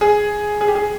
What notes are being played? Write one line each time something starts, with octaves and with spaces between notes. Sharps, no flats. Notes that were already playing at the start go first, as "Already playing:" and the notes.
G#4
G#4
G4
G#4